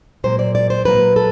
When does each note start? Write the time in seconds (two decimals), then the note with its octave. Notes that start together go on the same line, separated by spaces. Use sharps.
0.24 A#2 F#3 A#3 C5
0.39 D5
0.55 D5
0.70 C5
0.85 A#2 F#3 A#3 B4
1.16 A4